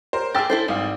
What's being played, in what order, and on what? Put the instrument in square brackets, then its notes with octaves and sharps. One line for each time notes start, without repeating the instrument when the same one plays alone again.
[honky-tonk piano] A#4 C5
[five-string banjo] G4 G#4 [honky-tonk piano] G5 E6 A6
[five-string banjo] E4 A4 C5
[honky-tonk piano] G#1 F5 [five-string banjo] G3